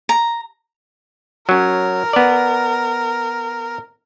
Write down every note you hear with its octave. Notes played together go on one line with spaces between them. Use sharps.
A#5
F#3 C#4 A#4
B3 D5